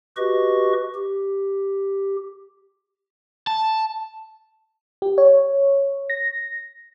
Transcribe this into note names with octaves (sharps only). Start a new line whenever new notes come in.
F#4 G4 B4 D#5 C#6
G4
A5
G4
C#5
A#6